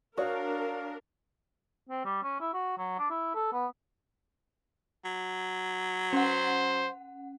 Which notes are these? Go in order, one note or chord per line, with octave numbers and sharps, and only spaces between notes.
D4 F#4 A#4 C#5 F5 D#6
C4
G3
C#4
E4
F#4
F#3
D4
E4
A4
B3
F#3
C#4 C5 F#5